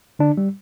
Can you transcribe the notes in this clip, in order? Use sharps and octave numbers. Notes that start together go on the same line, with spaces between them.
D3 D4
G3